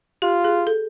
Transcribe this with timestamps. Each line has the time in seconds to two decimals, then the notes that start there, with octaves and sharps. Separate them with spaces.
0.22 F4 G4
0.44 G#4
0.67 A4